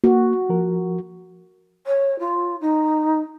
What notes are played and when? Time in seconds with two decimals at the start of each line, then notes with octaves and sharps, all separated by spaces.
0.04 A#3 F#4
0.49 F3 A#4
1.86 C#5
2.19 F4
2.60 D#4